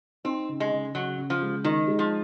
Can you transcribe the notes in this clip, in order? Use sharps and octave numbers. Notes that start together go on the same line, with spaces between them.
C4 D#4
C#3
G#3
C#3
C#3 F#3
C#3
F3
G#3
D#3 D#4
G#3
F3